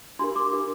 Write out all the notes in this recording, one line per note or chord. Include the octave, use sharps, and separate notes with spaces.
D4 G4 A#4 C6
D6
D4 G4 A#4